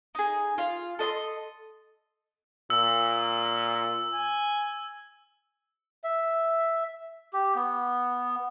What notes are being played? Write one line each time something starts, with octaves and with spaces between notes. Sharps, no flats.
D#4 G#4
F4 F5
A4 D#5 B5 C6
A#2 E6
G#5
E5
G4
B3